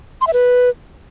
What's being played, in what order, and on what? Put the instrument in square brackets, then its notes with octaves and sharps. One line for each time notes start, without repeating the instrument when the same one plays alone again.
[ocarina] C6
E5
B4